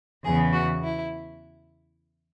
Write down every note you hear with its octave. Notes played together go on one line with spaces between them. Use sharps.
E2 C#3 E3 B3 G#4
F#4
E4